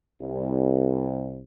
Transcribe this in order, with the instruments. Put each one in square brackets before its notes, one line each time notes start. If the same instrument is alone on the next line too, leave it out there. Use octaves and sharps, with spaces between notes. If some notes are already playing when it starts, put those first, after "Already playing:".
[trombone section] C2